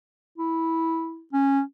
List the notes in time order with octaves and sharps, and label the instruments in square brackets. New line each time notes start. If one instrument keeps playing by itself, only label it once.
[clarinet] E4
C#4